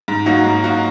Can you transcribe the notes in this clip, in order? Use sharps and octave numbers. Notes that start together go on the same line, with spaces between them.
G#2
F#3 A#3 D#4 F#4
G#2
F#3 A#3 D#4 F#4